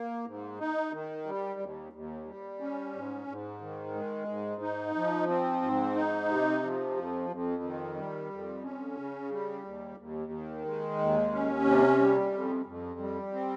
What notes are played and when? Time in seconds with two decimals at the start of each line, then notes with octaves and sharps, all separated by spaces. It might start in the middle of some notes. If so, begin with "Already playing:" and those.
Already playing: A#3
0.26 G#2
0.59 D#4
0.92 D#3
1.26 G3
1.60 D#2
1.93 D#2
2.26 G3
2.60 C#4
2.94 G#2
3.27 G#2
3.61 D#3
3.94 G#3
4.28 G#2
4.62 D#4
4.95 F3
5.28 C4
5.62 G#2
5.95 D#4
6.29 C3
6.63 F3
6.97 F2
7.30 F2
7.63 D#3
7.97 G3
8.31 F2
8.64 C#4
8.97 C#3
9.30 G3
9.65 D#2
9.98 D#2
10.32 D#3
10.65 G#3
10.99 D#2
11.32 C#4
11.65 C3
11.99 G3
12.33 F2
12.66 F2
12.99 G3
13.33 C4